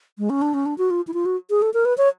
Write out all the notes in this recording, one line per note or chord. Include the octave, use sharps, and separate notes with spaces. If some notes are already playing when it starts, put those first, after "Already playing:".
G#3
C#4
D4
C#4
D4
F#4
F4
E4
F4
F#4
G#4
A4
A#4
B4
C#5